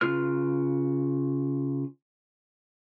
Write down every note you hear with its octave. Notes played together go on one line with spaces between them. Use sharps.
C#3 F4 B4 F6